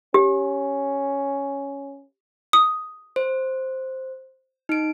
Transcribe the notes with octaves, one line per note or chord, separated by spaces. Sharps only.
C#4 G4
D#6
C5
D#4 D7